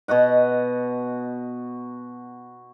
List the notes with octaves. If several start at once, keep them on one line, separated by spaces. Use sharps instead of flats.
B2 F#4 D#5 F#5